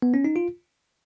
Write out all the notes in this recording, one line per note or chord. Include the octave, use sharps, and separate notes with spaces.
B3
C#4
D#4
F4